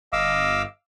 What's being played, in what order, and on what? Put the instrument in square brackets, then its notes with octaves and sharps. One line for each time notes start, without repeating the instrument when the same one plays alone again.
[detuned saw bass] G1 [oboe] D#5 [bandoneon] F5 D6 E6